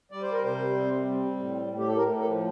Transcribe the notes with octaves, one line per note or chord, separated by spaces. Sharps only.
G3 D5
C5
A#4
C3 C5
C4
G3
A2
A2
G4
A4
A2 A#4
A4
F3